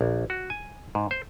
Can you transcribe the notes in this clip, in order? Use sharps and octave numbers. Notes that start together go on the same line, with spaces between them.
A#1
F#4
G#5
G#2
C5